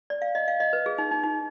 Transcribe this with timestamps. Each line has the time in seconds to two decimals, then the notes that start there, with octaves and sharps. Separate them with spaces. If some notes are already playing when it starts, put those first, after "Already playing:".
0.10 D5
0.22 F5
0.35 D#5
0.48 F5
0.60 D#5
0.73 B4
0.86 G#4
0.98 D#4
1.11 D#4
1.24 D#4